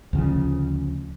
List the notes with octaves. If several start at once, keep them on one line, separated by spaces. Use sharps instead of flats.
D2 C#3 F3